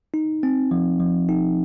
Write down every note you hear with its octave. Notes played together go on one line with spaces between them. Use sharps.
D#4
C4
F3
F3
D#4